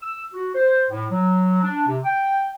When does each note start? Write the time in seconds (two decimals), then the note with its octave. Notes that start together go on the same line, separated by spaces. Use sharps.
0.01 E6
0.33 F#4
0.55 C5
0.91 A2
1.11 F#3
1.62 D4
1.87 C3
2.05 G5